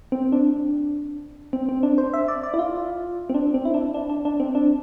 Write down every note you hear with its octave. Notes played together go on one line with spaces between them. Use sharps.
C4
D4
C4
C4
D4
C5
E5
D5
D5
E4
F4
C4
D4
C4
E4
D4
D4
D4
D4
C4
D4